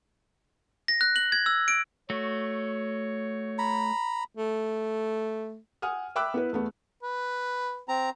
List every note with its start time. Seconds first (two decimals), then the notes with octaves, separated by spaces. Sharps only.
0.88 A#6
1.01 F#6
1.16 F#7
1.32 G#6
1.46 E6
1.68 D7
2.10 A3 F#4 C#5
3.58 A#5 B5
4.36 A3
5.82 F#5 G#5 D#6 F6
6.16 E5 G5 B5 D6 E6 F#6
6.34 B3 E4 B4
6.53 E2 A3 B3
7.03 B4
7.88 C4 A#5